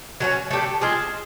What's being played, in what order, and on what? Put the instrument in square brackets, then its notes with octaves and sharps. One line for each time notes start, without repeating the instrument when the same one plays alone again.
[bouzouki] F#3 A3 C#4
A3 D4 G4
G#3 C4 F4 G#4